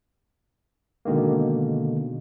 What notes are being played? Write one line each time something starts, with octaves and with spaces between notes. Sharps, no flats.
B2 D3 D#3 G#3 A#3